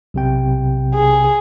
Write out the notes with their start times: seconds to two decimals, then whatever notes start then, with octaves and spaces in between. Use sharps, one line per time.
0.14 B1 C3 G5
0.95 G#4